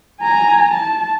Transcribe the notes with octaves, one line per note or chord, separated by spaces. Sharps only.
G#5 A#5
A5